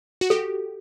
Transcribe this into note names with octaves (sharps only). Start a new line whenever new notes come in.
F#4
G4 A4